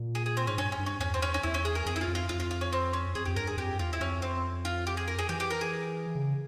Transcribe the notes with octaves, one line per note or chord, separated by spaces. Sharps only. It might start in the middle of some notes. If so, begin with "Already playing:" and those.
Already playing: A#2
G#4
G#4
C4
G#2 C#4
G2 C#4
C#4
G2
C#4
E2 C#4
C4
C#4
C#4
E2 E4
C#4
G#4
A#4
F2 G#4
E4
F4
F2
F4
F2 F4
F4
F4
C#4
C4
C#4
F2 G#4
F2 G4
G2 A#4
G#4
F2 G4
E2 F4
E4
F2 C#4
C4
F4
G4
G#4
A#4
G#4
E3 G4
G4
A#4
G#4
C#3